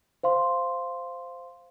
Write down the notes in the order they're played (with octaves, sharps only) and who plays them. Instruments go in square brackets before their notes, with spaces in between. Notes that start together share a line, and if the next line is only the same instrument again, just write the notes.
[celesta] C5 F5 C6